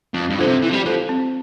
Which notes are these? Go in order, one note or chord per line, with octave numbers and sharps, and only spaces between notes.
F2 C4
G2
D3 F4 A4 C5
C3
E3 C4
F3
G3
F3 F4 A4 C5
C4